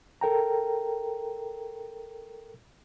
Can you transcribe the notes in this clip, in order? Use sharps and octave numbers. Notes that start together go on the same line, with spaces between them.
A4 A#4 G5 A#5